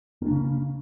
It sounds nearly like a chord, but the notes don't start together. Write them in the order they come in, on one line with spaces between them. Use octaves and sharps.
A#3 D4 C#3 C#4